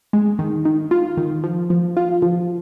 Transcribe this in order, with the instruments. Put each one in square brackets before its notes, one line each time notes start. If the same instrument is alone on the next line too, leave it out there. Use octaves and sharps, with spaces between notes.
[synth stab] G#3
D#3
D#3
F4
D#3
F3
F3
F4
F3